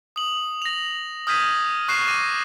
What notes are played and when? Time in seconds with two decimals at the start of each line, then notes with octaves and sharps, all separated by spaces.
0.16 D#6 F#7
0.62 A#6 F7
1.27 D#6 F6 G6 G#6 B6 D#7
1.88 C#6 F#6 C7 D#7 E7 F#7
2.07 D6 A#6 D#7